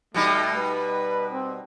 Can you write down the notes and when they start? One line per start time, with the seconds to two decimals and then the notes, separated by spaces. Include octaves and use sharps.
0.14 B2 G3 A3 D#4
0.55 B4
1.33 C4